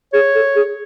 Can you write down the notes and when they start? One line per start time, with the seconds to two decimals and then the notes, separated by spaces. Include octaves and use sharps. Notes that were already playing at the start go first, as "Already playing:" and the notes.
0.13 G#4 C#5
0.35 A4
0.55 G#4